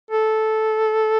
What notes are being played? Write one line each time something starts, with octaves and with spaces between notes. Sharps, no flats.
A4